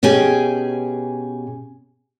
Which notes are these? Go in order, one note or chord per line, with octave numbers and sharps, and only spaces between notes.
B2 C#4 G4 G#4 G#5